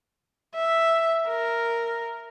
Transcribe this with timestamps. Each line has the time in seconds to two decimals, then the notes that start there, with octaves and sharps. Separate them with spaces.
0.55 E5
1.27 A#4